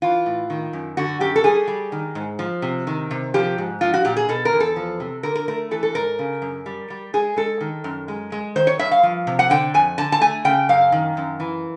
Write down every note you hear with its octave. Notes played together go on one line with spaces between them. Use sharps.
E3 F4
A2
D#3
F#2
D3 F#4
F#2 G4
A4
G3 G#4
G3
D#3
G#2
F3
C3
D#3
C3
F3 G4
G#2
F3 F4
F#4
A#2 G4
G#4
B2 A4
A#4
E2
A4
F3
C3
D3 A#4
A#4
A3 A#4
E3 A4
A4
G#2 A#4
C#3
F#2
G3
G3
G#3 G#4
G#3 A4
D#3
F#2
G#3
G#3
D#3 C5
C#5
G2 E5
F5
F3
C3
F#5
D3 G5
F2 G#5
D3 A5
A5
A3 G#5
C#3 G5
F#2 F5
D#3
F#2
E3